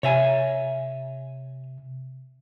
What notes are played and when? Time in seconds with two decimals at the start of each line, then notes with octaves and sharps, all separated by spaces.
0.03 C3 C#5 E5 G#5